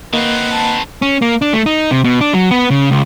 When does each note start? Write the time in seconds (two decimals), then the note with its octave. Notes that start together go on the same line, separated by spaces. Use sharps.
0.13 D#3 A#3 C4 B4 D#5 F#5
0.50 A5
1.02 C#4
1.22 A#3
1.42 D4
1.54 A3
1.66 D#4
1.91 C3
2.04 B2
2.21 D4
2.34 F#3
2.51 B3
2.71 C#3
2.91 C#2